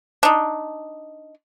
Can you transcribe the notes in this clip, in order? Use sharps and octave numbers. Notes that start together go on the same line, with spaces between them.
D4 D#4